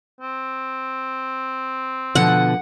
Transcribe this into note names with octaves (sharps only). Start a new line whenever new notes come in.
C4
B2 D3 F3 F#5